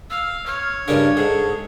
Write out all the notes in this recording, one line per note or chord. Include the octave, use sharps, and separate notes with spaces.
F5 E6
C#5 F6
G2 C#3 D4 A#4
G#2 G#4 A4